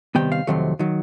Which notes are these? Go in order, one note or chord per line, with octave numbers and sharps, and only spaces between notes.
C3 D#3 G3 B3 G5
F5
F2 C3 D#3 F#3 A3
D#3 F#3